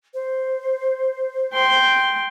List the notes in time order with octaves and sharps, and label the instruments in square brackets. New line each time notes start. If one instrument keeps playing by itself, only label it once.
[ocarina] C5
[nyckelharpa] G5 C6